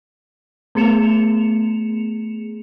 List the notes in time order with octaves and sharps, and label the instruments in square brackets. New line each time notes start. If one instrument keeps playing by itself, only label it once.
[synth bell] A3 B3 G#4 C#7 E7 F7